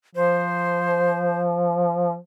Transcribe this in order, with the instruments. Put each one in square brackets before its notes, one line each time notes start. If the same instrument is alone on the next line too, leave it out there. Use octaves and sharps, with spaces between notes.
[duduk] F3 [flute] C5